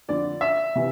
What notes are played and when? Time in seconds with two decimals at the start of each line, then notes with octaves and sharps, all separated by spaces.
0.08 F2 D3 D5
0.41 E5
0.76 C3 E3